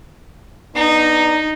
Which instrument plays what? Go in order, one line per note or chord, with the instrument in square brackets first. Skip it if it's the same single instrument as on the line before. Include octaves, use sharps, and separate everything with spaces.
[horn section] B3 D4 A#5 [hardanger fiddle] D#4